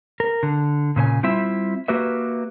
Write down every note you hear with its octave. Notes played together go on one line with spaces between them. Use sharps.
A#4
D3
A#2 C#3 C5 G#5
G3 C4 E4 F4 E5
A#3 F#4 G4 B4 E5